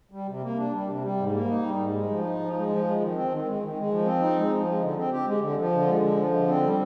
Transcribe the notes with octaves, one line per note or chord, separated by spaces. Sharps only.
G3
C3
A#3
D4
G3
C3
G3
G#2
A#3
D#4
G3
G#2
G#3
F3
D#4
F3
G#3
F3
G#3
D#3
C4
D#3
G#3
D#3
G#3
F3
C4
D#4
G#3
F3
G#3
D3
C4
G4
G#3
D3
F3
D3
G#3
D3
F3
D3
C4
G3